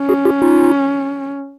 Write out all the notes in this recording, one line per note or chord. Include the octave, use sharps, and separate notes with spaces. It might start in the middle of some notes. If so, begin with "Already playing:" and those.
Already playing: C#4
F#4 G#4
F4 G4
D#4 F4